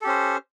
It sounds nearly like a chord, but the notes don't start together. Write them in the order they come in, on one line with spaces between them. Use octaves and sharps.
A4 G4 C#4 C5